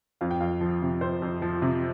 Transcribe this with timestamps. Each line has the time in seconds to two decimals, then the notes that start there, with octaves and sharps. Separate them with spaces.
0.21 F2 F5
0.31 G5
0.40 F2 F5
0.61 F3
0.82 C3
1.01 F2 C5
1.22 F2
1.42 F3
1.62 C3